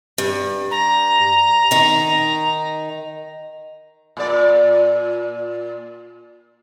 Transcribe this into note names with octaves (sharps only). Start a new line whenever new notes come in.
G2
A#5
D#3 D#4
A#2 D5